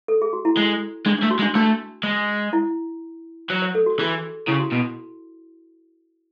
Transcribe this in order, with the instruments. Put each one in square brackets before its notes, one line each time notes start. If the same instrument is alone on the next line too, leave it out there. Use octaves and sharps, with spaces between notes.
[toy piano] A4
G#4
F#4
E4
[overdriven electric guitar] G#3
[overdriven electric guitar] G#3 [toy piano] D4
[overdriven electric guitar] A3 [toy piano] D4
[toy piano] F#4
[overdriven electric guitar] G#3
[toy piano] D4
[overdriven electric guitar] A3 [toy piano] D4
[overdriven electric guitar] G#3
[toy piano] E4
[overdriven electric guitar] F#3 [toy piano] C#5
[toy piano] C#5
A4
F#4
[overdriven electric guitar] E3 [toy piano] G#4
[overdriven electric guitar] C#3 [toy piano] E4
[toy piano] F#4
[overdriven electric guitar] B2